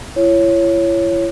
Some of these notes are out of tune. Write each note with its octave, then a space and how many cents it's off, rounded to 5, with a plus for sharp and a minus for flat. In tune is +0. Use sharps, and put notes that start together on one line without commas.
E4 +45 C#5 +0